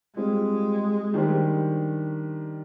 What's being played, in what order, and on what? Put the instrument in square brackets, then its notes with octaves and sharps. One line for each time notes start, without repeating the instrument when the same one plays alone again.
[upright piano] G3 C4 F4 [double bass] G#3
[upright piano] D#3 G3 D4 G4 C5